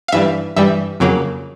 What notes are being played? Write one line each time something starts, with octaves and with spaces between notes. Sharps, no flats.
F5
G2 E3 G3 E5
G2 E3 G3 E5
F2 C#3 F#3 A#3